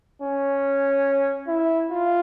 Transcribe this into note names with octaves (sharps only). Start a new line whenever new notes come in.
C#4
E4
F4